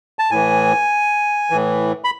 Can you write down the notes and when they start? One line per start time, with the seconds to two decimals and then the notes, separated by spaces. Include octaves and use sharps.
0.19 A5
0.31 A2 E3 G#5
1.50 A2 E3
2.04 B5